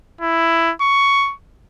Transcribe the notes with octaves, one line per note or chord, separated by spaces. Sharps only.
E4
C#6